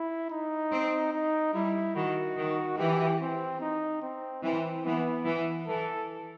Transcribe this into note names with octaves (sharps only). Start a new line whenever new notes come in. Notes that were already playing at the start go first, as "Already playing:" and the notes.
Already playing: E4
D#4
C4
D#4
G3 E4
D#3 F#4
D#3
E3 G4
C4
D#4
C4
E3 C4
E3 B3
E3
E3 A4